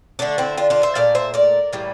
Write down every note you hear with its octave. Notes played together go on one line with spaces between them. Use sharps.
D3 A3 D4
C4 E4
D4 F4
D4 F4
C5 E5
A#2 A3 D5 F5
C5 E5
A#4 D5
A2 E3 G3 A#3